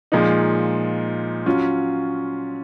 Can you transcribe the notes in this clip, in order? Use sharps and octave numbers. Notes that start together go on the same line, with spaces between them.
A#2 F3 G#3 D#4
F#3 C#4 F4